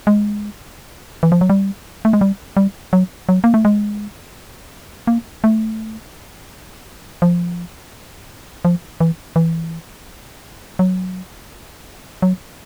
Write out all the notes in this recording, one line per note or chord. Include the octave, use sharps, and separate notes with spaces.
G#3
E3
F3
F#3
G3
A3
G#3
G3
G3
F#3
F#3
A#3
A3
G#3
A#3
A3
F3
F3
E3
E3
F#3
F#3